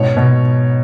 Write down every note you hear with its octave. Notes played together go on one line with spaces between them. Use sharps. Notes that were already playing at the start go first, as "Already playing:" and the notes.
Already playing: G#2 B2 C#5
B2